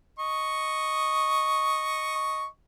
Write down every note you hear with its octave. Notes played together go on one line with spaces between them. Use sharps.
D#5 C#6